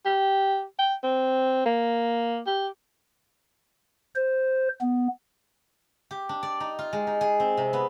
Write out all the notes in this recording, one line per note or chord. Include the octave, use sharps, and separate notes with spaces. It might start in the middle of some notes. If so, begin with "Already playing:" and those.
G4
G5
C4
A#3
G4
C5
B3
G4
D4
D5
D#4
F4
G#3
D#4
G#4
C4
C3
B3